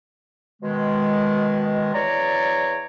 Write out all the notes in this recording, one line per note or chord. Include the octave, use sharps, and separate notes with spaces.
B2 D#3 G#3
E2 C#5 D5 A#5